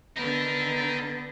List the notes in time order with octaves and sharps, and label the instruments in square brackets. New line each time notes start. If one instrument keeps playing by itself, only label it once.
[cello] D3 B3 [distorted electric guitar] D#4 A#4